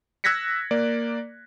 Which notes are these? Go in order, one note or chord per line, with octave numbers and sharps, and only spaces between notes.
E6 F#6 G#6 A#6 B6 C#7
A#3 D5